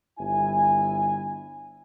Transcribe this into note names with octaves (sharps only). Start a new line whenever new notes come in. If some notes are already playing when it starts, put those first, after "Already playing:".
G1 E4 G#5